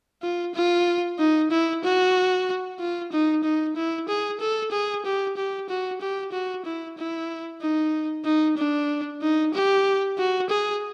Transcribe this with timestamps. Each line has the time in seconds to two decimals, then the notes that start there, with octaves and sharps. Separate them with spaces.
0.22 F4
0.55 F4
1.19 D#4
1.51 E4
1.84 F#4
2.80 F4
3.12 D#4
3.44 D#4
3.76 E4
4.09 G#4
4.41 A4
4.72 G#4
5.05 G4
5.37 G4
5.69 F#4
6.01 G4
6.32 F#4
6.65 E4
6.98 E4
7.62 D#4
8.25 D#4
8.58 D4
9.22 D#4
9.54 G4
10.18 F#4
10.50 G#4